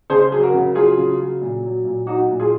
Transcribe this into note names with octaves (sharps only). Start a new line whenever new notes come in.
C#3 G#4 C5
F#3 G#4
F#4 A#4
C#3
F#3 F4 G#4
C#3
F#3
A#2
F#3
A#2
F#3 D#4 F#4
A#2
F4 G#4